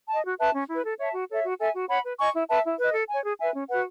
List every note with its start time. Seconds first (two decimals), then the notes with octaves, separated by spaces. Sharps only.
0.09 D#5 A5
0.24 F#4
0.39 B4 E5 A5
0.54 C#4
0.69 E4 B4
0.84 A4
0.99 C#5 E5 A5
1.14 F#4
1.29 A4 C#5 E5
1.44 F#4
1.59 A4 E5 G#5
1.74 F#4
1.89 C#5 F#5 B5
2.04 B4
2.19 D#5 G#5 C#6
2.34 E4
2.49 B4 E5 A5
2.64 E4
2.79 B4 D#5
2.94 A4
3.09 C#5 G#5
3.24 G#4
3.38 B4 E5 G#5
3.53 C#4
3.69 F#4 B4 F#5